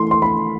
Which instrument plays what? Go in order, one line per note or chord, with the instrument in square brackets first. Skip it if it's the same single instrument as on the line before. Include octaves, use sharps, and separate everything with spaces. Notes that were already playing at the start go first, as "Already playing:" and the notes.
Already playing: [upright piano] E3 A3 E4 [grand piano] C6
[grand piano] C6
B5